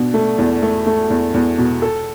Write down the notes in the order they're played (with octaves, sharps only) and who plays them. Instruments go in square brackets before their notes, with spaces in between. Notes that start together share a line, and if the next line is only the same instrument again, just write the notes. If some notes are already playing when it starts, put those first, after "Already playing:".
Already playing: [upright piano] B2 D4
A3
E2
A3
A3
E2
E2
B2
A4